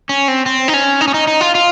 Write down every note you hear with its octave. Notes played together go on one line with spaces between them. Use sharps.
C#4
C4
C4
D#4
C#4
D#4
C#4
D#4
D#4
F4
F4